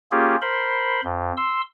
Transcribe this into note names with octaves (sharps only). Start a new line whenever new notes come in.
A#3 C#4 F4 G4 G#4
A#4 C5 B5 C6
F2
C6 E6